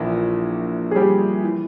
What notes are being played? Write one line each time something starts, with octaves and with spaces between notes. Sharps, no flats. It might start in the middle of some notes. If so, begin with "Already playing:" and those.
Already playing: A#1 A#2 E3 E4
G#4
G3 G4
E3